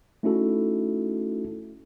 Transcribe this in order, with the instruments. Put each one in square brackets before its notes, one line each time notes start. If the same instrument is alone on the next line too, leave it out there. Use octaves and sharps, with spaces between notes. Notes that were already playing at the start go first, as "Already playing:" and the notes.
[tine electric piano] A3 C#4 D#4 E4 F#4 A4